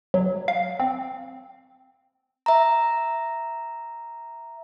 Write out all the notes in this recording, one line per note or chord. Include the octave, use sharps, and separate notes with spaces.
F#3
F5
C4
E5 A#5